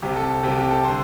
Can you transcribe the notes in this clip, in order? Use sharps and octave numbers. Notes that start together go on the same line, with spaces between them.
C2 C3 G4
A4
C2 C3 G4
G4
A4
D3 C5